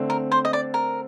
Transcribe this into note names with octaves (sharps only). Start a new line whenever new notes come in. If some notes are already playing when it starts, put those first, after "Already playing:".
Already playing: D3 A3 C4
A#4
C5
D#5
D5
A#4